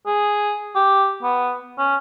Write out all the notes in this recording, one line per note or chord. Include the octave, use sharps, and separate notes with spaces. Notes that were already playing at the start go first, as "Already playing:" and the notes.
G#4
G4
B3
C#4